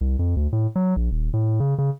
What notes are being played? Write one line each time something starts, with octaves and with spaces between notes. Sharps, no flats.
C2
F2
D2
A2
F#3
A#1
D#1
A2
C#3
C#3